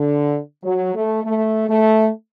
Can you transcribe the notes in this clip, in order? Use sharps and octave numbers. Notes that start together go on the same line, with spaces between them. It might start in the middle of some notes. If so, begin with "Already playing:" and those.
Already playing: D3
F#3
A3
A3
A3